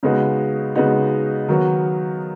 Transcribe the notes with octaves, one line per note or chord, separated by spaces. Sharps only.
C#3 G#3 B3 D#4 F#4
C#3 G#3 B3 D#4 F#4
D#3 F#3 B3 F#4